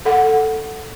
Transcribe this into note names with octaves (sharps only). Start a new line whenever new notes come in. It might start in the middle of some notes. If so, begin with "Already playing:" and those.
A4 F#5